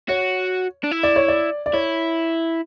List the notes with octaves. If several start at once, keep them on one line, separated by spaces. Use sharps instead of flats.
F#4 C#5
D4
E4
D5
C#5
D5
D5
E4 C#5